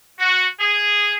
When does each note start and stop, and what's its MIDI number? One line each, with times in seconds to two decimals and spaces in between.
0.19 0.45 66
0.59 1.15 68